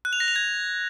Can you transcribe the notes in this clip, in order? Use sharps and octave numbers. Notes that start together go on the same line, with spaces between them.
F#6
F7
A#6
F7
G#6